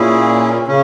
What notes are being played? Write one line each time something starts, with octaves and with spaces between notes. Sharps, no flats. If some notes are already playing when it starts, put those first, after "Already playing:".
Already playing: A#2 C#4 E4 G#4
C#3 C#4